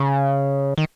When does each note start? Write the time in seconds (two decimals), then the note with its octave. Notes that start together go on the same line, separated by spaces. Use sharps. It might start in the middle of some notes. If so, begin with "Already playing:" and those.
Already playing: C#3
0.78 D#3